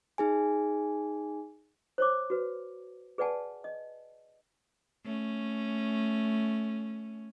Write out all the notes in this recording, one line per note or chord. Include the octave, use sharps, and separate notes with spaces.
D#4 G#4 G#5
C5 C#5 D6
F#4 B4
G#4 B4 D5 F#5 G#5 A5
D#5
A3 C#4